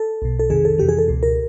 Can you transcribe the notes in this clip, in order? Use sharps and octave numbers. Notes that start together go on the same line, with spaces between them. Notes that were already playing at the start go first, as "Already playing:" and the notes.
Already playing: A4
B1 B2
A4
F2 C3 D#3 G#4
A4
F2 C3 E3 G4
G#4
A4
C#2 B2
A#4